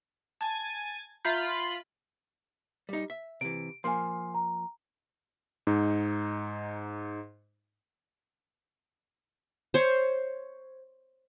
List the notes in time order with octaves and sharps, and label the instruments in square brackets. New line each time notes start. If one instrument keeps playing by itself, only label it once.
[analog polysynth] G#5 G#6 A6 [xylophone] A5
[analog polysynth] F4 B5 [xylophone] E5 A#5 G6
[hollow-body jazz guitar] G3 D#4
E5
[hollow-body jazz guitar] C3 E3 [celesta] D7
[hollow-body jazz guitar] F3 A#3 [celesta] G#5 C6
[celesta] A#5
[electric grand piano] G#2 D#4
[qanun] C5 C#5